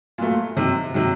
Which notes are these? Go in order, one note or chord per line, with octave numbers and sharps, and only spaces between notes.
A#2 F#3 A3
C3 D#3 F#3
C3 D#3 F#3